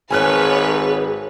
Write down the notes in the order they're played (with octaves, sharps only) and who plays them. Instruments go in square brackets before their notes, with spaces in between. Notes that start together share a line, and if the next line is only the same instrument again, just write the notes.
[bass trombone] G#1 [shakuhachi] G#4 [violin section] B4 C#5 [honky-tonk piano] G#5 F6 F#6